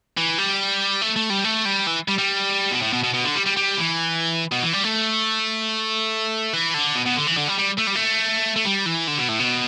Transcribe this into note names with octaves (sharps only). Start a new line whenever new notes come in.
E3
G3
A3
A3
G3
A3
G3
E3
G3
G3
B2
A2
B2
B2
B2
D3
G3
G3
G3
E3
B2
E3
G3
A3
E3
D3
B2
B2
D3
E3
D3
G3
G3
A3
G3
A3
A3
G3
E3
D3
B2
A2
B2